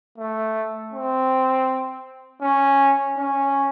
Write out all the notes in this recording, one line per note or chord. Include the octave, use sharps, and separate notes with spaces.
A3
C4
C#4
C#4